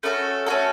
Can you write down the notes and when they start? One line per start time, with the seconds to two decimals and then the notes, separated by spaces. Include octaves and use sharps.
0.03 A3 C#4 F#4 A4
0.46 A3 C#4 F#4 A4